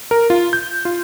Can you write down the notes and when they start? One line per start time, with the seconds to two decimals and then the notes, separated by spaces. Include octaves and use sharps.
0.11 A#4
0.30 F4
0.53 G6
0.85 F4